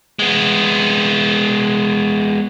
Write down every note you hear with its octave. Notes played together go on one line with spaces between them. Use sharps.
G#3 B3